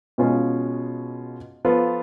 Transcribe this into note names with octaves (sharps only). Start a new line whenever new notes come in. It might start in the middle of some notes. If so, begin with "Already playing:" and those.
B2 G#3 C#4 F4
F3 B3 F4 A4